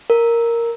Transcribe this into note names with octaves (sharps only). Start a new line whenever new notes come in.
A#4